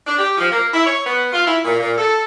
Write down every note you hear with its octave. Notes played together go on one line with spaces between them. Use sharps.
D4
G4
F3
A#3
E4
C#5
B3
F4
E4
A#2
A#2
A4